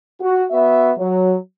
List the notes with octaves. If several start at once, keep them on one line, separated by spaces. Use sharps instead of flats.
F#4
B3 F#4 E5
F#3